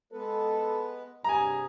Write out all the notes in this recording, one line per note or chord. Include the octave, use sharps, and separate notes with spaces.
G#3 B3 A4 B4
G2 C3 G#4 G#5 A#5